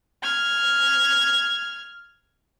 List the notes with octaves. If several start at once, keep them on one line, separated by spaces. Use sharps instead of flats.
F6 G#6